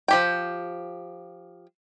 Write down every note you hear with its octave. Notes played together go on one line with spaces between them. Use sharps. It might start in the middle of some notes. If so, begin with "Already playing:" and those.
F3 G4 G5